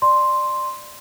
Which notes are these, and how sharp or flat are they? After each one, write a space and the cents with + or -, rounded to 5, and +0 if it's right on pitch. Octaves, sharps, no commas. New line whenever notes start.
D5 +15 C6 +0